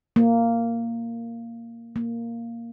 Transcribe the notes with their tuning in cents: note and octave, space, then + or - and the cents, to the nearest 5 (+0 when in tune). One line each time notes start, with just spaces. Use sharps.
A#3 -10
A#3 -5